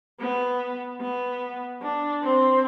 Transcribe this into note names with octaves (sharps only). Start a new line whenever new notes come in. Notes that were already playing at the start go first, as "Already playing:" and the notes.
B3
B3
D4
C4